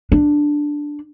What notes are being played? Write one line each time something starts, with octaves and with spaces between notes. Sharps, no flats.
D4